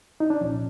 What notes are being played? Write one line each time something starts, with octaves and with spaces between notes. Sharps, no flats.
D#4
D4
C2 A#2 F3 C#4